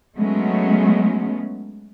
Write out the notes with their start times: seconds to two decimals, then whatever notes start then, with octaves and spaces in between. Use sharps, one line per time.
0.17 F#3 G#3 A3 B3 C#4